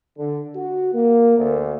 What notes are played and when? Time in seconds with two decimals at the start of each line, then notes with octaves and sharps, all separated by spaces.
0.19 D3
0.56 F#4
0.94 A#3
1.38 D2